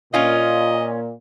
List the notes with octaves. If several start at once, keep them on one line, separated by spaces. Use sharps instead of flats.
A#2 C#4 F4 D#5